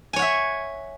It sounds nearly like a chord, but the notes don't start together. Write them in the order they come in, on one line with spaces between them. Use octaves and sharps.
G#5 C#5 F#5 E5